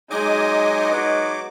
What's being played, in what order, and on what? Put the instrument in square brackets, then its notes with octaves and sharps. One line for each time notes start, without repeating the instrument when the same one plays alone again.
[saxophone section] F#3 D#4 [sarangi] G#3 [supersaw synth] D#5 G#5 D6
[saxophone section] F#3 B3 D#4 [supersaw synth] D6